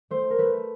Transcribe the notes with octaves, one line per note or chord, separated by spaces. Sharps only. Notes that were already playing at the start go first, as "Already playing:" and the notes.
A3 C5
A#4
A3 B4